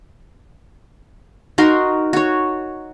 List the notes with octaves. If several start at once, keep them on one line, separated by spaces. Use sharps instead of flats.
D#4 F#4 A#4 C6
F#4 C#5